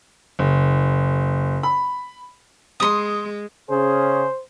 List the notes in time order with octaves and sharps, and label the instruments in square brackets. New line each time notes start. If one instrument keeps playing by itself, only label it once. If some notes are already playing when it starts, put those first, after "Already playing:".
[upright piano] F#1
B5
[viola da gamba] G#3 [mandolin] C6 D#6
[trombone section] C#3 C#4 G#4 [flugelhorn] C5